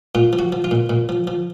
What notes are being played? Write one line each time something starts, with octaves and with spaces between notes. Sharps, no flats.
A#2 F4
F3
F#4
F3
F4
A#2
A#2
F3
F3